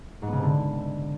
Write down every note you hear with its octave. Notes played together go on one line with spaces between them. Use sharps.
G#2
B3
C#3
C3
D3